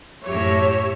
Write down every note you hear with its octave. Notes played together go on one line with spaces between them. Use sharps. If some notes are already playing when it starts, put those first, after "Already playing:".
F#2 A2 G4 C#5 E5